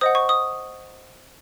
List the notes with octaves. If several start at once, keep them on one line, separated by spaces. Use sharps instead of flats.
C5 D#5 F#5 D#6
C#6
D#6